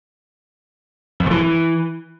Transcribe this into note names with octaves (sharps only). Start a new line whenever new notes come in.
F2
G2
E3